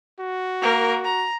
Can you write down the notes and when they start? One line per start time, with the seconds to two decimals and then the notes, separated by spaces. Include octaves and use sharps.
0.20 F#4
0.61 A#3 A#4
1.04 A#5